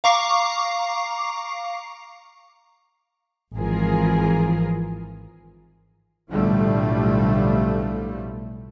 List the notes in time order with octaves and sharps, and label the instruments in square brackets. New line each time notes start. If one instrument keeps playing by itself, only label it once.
[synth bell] F5 A#5 C#6 D6 C7
[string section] G#1 E3 F3 F4 G#4 A#4
[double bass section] B1 A2 D3 F3 G3 A3